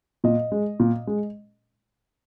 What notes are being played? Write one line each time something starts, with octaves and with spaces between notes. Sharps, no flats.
A#2 D#5
G#3
A#2
G#3